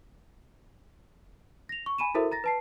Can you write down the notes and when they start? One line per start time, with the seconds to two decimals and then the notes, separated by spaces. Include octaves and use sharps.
1.69 A#6 F7
1.86 C#6
1.98 G#5 B5 D#7 E7
2.14 E4 F#4 A4 A#4 C5 E5
2.32 A#5 A6 A#6
2.44 B4 A5 C7